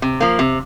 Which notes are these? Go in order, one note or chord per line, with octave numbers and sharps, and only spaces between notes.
C3
F3 A#3
C3